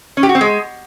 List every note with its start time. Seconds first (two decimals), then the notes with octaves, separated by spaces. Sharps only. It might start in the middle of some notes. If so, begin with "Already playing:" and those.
0.17 C#4
0.23 G4
0.29 F#4
0.35 C4
0.41 G#3